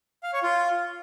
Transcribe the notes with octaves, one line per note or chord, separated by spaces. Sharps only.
F5
C#5
F4